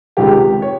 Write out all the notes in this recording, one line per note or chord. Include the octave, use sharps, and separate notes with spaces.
C#2 C3 D#3 G#3 G4
C#5